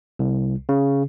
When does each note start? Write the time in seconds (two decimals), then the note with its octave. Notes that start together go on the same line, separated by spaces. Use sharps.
0.19 C2
0.69 C#3